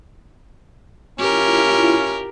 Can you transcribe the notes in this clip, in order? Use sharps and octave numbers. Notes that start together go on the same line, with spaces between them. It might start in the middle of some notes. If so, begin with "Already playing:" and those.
C#4 E4 F4 G4 A#4